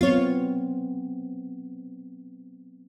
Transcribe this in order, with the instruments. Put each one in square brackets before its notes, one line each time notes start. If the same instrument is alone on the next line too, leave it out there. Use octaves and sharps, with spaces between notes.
[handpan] F#3 B3 C4 [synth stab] F4 C#5